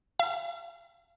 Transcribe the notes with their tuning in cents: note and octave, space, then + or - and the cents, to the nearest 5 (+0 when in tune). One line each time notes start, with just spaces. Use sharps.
F5 -35